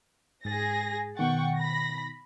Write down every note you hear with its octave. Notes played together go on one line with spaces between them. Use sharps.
G#2 G#4 A6 A#6
B2 D#3 F#5 G5 C#6 A6
B5 A#6